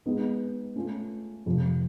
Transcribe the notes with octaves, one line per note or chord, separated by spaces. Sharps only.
G#3 B3 D#4
A3 C#4 F4
F2 C3 F3